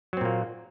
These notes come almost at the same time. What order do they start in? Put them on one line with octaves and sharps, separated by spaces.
F#3 C4 A#2 A#3